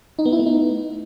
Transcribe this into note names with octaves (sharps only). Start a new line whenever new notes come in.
D#4
B3
E4
A3
D#4